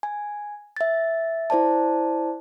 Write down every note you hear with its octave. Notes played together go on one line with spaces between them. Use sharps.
G#5
E5 A6
E4 C5 D5 A5